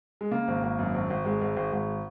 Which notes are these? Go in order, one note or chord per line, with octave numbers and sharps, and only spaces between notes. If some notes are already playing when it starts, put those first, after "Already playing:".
G#3
C#3 A#3
G#1
G#1
F#2
G#1
G#1
G#1 G#3
G#1
G#1
G#1